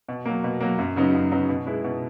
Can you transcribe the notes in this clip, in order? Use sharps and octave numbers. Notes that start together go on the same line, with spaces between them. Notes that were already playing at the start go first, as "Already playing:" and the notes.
B2
F#3 A#3
B2
F#3 A#3
F#2
C#3 F#3 B3 D#4
F#2
C#3 F#3 B3 D#4
B2
G#3 B3 E4
B2